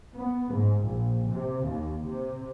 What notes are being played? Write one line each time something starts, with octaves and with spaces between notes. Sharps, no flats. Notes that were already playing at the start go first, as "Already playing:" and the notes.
B3
G#2
A#1
C3
D#2
C3